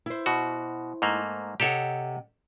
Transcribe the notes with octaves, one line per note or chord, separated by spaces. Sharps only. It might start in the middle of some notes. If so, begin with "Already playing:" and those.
E4 C5
B2 F#4
G#2 A3 A#3
C3 G4 A4 C#5 D#5 F#5